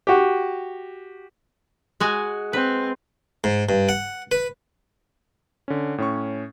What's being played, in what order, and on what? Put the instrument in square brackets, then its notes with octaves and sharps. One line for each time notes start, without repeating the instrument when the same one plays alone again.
[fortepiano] F#4 G4
[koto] G#3 F#4 G#5
[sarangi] C4 [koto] B4
[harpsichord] G#2
G2
F#5
B4
[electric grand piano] D3 C#4
A2 C#4 C#6